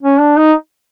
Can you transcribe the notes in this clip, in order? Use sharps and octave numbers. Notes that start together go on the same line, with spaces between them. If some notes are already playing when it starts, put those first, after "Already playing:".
C#4
D4
D#4